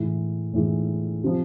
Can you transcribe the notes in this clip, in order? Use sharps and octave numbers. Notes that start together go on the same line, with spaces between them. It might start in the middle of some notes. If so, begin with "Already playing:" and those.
Already playing: A2 E3 G#3
A2 E3 G#3
C3 F3